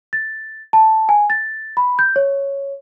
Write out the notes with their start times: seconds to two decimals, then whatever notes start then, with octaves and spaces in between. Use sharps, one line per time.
0.13 A6
0.73 A5
1.09 G#5
1.30 A6
1.77 B5
1.99 G6
2.16 C#5